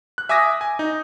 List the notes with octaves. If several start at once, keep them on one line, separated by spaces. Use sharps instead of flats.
F#6
E5 G#5 D6 D#6 A#6
G#5
D#4